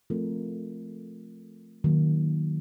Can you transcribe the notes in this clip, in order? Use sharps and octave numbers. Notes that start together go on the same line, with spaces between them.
F3 A3 C4 F4 A#4
D#3 F#3 A#3